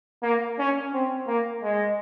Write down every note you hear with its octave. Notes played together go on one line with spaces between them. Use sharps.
A#3
C#4
C4
A#3
G#3